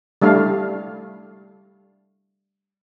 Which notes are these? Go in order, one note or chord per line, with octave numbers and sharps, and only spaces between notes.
G3 A3 D4 F5